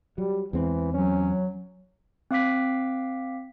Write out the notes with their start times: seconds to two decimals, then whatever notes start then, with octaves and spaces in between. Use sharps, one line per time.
0.18 F#3 G3
0.53 E2 E3 G#3 C4
0.94 F#3 C#4
2.31 C4 F5 D6 B6